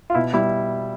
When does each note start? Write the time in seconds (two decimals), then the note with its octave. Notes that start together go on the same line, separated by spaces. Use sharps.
0.10 F4
0.15 B2 E4
0.33 G3 E4